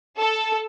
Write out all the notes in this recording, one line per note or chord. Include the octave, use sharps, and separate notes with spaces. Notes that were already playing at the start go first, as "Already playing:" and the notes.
A4